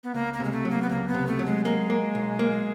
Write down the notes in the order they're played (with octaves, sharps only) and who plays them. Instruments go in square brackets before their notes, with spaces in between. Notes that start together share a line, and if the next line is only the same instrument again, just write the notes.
[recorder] B3
[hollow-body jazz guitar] C#2 [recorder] A#3
[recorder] A#3
[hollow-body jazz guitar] C3 [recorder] G#3
[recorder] A3
[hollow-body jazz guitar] F#3
[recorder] A#3
B3
[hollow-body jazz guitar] C#2 [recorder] A#3
[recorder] B3
[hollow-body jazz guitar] C3
[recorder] A3
[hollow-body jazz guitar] F#3
[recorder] G#3
[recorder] G#3 [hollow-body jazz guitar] A#3
[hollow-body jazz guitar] A#3
B1
A#3